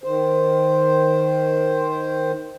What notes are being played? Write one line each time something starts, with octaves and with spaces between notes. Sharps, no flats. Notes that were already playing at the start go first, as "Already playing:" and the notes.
D#3 C5